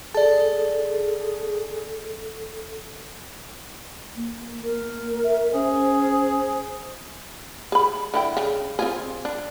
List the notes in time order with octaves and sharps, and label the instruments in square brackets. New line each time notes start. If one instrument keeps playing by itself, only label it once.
[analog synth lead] G#4 [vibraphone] A4 [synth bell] D5 A5
[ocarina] A#3
[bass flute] A#4
[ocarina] E5
[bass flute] C#4 [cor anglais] G#4 [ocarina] C5
[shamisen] G#4 B5
D3 E4 G5
C#3
C4 F4 G#4
D4